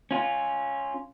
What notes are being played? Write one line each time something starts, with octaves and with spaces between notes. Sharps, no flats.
C#4 F4